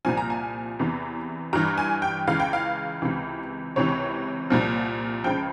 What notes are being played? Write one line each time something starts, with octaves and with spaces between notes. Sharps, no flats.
C2 A#2 F3 G#5
A#5
G#5
E2 C3 E3
G2 E3 A#5
G#5
G5
C#2 C#3 E3 F5
G5
F5
C#2 C3 E3
C#2 C3 E3 C#5
C2 A#2 F3
C#2 C#3 F3 G5